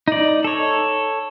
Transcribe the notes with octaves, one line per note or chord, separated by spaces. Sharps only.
D#4 D5
A4 C#5